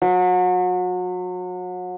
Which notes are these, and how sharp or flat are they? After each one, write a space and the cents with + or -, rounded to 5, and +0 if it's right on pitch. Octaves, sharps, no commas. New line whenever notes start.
F#3 -35